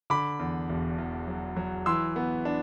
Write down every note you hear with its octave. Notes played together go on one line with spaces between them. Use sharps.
D3 B5 D6
E2
E1
E2
F#3
F#3
E3 C6 E6
B3
D4